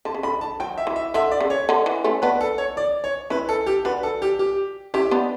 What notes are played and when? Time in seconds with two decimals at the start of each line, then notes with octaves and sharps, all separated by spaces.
0.05 D3 A5
0.14 C#3
0.23 D3 B5
0.41 A5
0.60 F#3 G5
0.77 E5
0.87 E3
0.96 E5
1.14 D3 E5
1.31 D5
1.40 C#3
1.50 C#5
1.69 D3
1.86 E3
2.04 A3 C#4
2.22 B3 D4 B4
2.41 A4
2.58 C#5
2.77 D5
3.04 C#5
3.30 C#4 E4 B4
3.49 A4
3.66 G4
3.85 D4 F#4 B4
4.03 A4
4.22 G4
4.39 G4
4.94 C#4 E4 G4
5.11 B3 D4